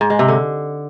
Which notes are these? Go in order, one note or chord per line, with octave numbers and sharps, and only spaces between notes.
G#2
G#3
C3
D3